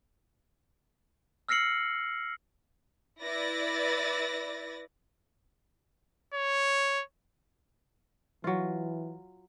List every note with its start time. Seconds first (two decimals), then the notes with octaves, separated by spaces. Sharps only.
1.49 E6 F6 A#6 C7 C#7 F#7
3.21 E4 B4 D5 A6 A#6
6.34 C#5
8.44 E3 F#3 F4